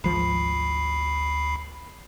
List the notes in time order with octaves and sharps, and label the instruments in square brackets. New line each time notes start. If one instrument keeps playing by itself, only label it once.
[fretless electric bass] G#1 F3 [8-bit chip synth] D2 B5 C7